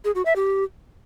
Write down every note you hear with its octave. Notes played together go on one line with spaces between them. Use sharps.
G#4
F#4
E5
G4